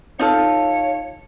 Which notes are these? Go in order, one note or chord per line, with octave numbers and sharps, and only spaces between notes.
D#4 F4 A4 C#5 F5